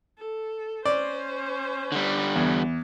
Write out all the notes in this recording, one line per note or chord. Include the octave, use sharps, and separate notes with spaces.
A4
C#4 C5 D5
D3 G3
E2